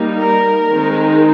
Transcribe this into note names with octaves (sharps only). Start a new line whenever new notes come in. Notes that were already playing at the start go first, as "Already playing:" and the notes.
Already playing: G3 A#3 D#4
A#4
D#3 G#3 C4 D#4